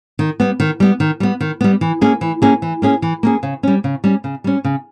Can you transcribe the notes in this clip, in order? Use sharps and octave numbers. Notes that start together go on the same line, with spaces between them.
D#3
G3 B3
D#3
G3 B3
D#3
G3 B3
D#3
G3 B3
E3
A#3 C#4 G#4
E3
A#3 C#4 G#4
E3
A#3 C#4 G#4
E3
A#3 C#4 G#4
C#3
G3 C#4
C#3
G3 C#4
C#3
G3 C#4
C#3